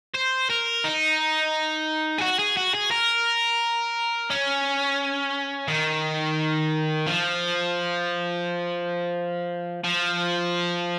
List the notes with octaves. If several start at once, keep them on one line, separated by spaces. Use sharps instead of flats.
C5
A#4
D#4
G#4
F#4
G#4
F#4
G#4
A#4
C#4
D#3
F3
F3